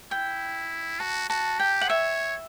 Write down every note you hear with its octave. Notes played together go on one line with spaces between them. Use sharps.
E4 G5
F#4 A5
F#4 A5
G4 G5
F#5
C#5 E5